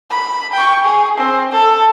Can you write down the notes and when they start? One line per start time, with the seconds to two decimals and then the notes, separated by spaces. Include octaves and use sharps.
0.11 B5
0.53 G5 C#6
0.84 G#4
1.18 C4
1.52 A4